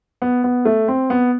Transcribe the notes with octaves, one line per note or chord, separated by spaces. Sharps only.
B3
B3
A3
C4
B3